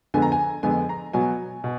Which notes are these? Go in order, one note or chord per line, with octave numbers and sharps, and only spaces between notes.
F2 D3 G#3 B3 G#5
A#5
G#5
F2 D3 G#3 B3 G#5
A#5
B2 F#3 B3 G#5
B2